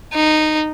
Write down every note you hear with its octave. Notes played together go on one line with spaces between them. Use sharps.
D#4